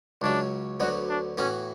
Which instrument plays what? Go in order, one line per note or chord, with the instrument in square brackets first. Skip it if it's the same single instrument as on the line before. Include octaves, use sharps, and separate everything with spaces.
[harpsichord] C#2 C#3 F#3 [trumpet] D4
[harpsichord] D2 D3 F#3 B3 [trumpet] F#4
[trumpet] D4
[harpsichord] A2 E3 B3 F#4 [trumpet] C#4